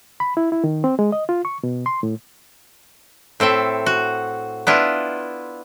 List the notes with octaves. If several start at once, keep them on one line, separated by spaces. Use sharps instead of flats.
B5
E4
E4
D#3
C4
G#3
D#5
F4
C#6
B2
C6
A2
A2 C4 A4 E5
F#4
B3 D4 E4 F4